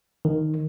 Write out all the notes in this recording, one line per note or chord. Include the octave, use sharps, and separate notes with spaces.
D#3